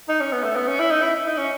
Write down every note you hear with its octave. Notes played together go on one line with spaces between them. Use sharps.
D#4
C#4
B3
A3
B3
C#4
E4
D#4
E4
D#4
C#4